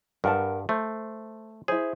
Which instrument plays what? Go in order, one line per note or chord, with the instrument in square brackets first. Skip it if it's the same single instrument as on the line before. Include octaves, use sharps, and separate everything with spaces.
[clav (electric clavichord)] G2 [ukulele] A#4 F#5 A5
[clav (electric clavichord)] A3 [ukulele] C5
[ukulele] E4 C5 [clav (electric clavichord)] G#4